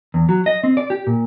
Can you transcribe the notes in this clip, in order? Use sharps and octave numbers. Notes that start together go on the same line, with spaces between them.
E2
F#3
D#5
C4
D5
G4
A#2